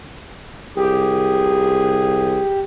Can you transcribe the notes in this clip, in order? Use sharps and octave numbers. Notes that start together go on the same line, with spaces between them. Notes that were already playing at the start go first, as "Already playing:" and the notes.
C2 G4 G#4